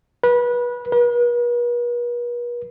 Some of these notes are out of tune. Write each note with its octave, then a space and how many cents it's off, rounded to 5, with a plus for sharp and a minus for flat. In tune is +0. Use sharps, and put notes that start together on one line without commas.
B4 -25
B4 -45